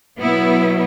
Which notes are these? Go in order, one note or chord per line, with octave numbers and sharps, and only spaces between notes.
B2 F#3 B3 E4